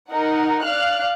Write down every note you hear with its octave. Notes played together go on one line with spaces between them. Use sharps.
D#4 A#4 F#5
D5 F5 F6 F#6